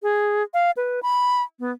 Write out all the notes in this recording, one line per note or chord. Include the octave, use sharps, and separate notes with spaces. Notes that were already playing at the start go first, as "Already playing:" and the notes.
G#4
F5
B4
B5
B3